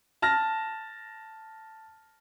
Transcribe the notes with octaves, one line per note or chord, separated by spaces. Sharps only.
A5 F6 A#6